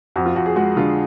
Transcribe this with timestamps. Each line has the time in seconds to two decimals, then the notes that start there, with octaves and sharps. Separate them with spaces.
0.16 F2 F#4
0.26 F4
0.36 F2 F#4
0.46 G#4
0.56 G#3 F#4
0.77 D3 F4